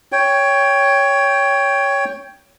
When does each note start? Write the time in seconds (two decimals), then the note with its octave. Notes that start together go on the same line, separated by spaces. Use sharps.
0.12 C#5 G5